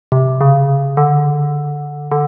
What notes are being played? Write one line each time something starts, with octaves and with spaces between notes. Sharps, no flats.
C3
C#3
D3
D3